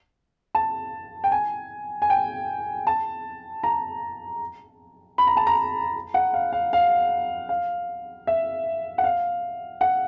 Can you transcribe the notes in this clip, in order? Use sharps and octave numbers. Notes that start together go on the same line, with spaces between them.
A5
G5
G#5
G#5
G5
A5
A#5
B5
A#5
A5
A#5
F#5
F5
F5
F5
F5
E5
F#5
F5
F#5